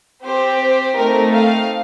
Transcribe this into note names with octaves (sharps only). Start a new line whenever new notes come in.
C4 G4 C5
C5
A3 C4 D#4 A#4
F5